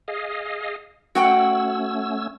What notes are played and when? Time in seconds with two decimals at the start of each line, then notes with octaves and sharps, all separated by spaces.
0.08 G#4 D#5 F5
1.15 A3 C#4 F#4 F#5 G5 E6